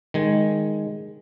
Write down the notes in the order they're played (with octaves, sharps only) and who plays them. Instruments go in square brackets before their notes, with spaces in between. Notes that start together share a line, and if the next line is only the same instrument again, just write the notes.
[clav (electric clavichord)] D#3 G#3 G#5